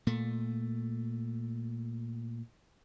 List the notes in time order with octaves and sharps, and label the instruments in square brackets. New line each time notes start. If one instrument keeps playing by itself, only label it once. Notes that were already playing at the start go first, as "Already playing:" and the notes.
[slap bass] A#2 A3